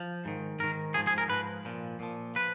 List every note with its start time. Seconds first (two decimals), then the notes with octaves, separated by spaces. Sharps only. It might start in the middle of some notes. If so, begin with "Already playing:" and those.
Already playing: F3
0.25 G#2 D#3
0.59 G#2 D#3 A#4
0.94 G#2 F3 G#4
1.07 G#4
1.18 A#4
1.30 G#2 F3 B4
1.65 A#2 F3
2.00 A#2 F3
2.36 F3 B4